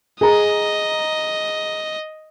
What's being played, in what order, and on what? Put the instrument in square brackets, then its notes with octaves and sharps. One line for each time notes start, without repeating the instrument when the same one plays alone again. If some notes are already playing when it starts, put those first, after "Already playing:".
[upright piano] G#4 A#5 [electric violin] D#5